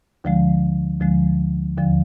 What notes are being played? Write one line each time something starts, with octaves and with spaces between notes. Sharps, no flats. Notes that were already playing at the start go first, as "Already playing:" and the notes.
D2 D3 F3 G#3
D2 D3 F3 G#3
D#2 D3 F3